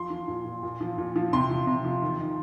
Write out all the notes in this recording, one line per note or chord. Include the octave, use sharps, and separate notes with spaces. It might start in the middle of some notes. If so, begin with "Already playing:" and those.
Already playing: F3 C6
F3
A#2
A#2
A#2
F3
A#2
F3
C3 C6
F3
C3
F3
D#3
D#3